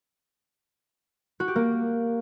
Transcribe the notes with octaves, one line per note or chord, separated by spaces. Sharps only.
F#4
G4
A#3